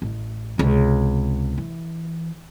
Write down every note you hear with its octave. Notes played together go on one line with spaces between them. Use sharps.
A1
C#2 C3
E3